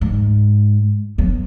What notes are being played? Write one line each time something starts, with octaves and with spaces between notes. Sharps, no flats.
G#2
F#3 B3